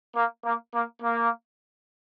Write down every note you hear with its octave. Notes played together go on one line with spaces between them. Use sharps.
A#3
A#3
A#3
A#3